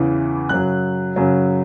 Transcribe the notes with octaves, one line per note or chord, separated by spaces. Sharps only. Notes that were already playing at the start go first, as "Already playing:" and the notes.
Already playing: E2 C#3 E3
F#2 C#3 F#3 F#6
F#2 C#3 F#3